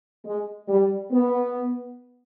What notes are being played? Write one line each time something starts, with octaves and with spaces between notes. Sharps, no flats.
G#3
G3
B3